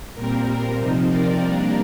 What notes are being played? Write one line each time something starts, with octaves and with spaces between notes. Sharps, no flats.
A#2 G3 C4 A#4
C3 F3 C4 D#4
A#4 D5
C3 G3 A#3 D4